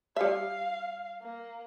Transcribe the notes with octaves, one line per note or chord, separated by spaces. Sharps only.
G3 E5 F5
A#3